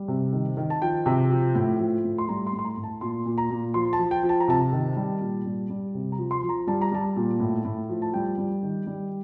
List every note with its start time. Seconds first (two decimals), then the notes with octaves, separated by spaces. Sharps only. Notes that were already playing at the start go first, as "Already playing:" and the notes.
Already playing: G3
0.08 C3
0.33 D#3
0.57 D#3
0.70 A5
0.82 F3 G5
1.06 C3
1.31 F3
1.55 A2
1.79 F3
2.04 A2
2.18 C6
2.28 G3 A#5
2.47 C6
2.52 A2
2.59 C6
2.64 A#5
2.77 A2
2.83 A5
3.01 A#2 C6
3.26 A#2
3.38 A#5
3.50 A#2
3.74 F3 C6
3.93 A5
3.99 F3
4.11 G5
4.23 F3
4.29 A5
4.40 A#5
4.48 C3 A5
4.73 D#3
4.96 G3
5.21 A#2
5.45 G3
5.70 G3
5.94 C3
6.12 A#5
6.18 F3
6.31 C6
6.43 F3
6.49 A#5
6.67 G3 A5
6.81 A#5
6.92 G3 A5
7.16 A#2
7.40 A2
7.65 A2
7.89 F3
8.02 A5
8.14 G3 G5
8.38 G3
8.63 D#3
8.87 G3